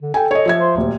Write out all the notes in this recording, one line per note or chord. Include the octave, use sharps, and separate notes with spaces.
D3
A4 G5 G#5
C#5 D#5
F3 E5 G#6
C5
D#1 D2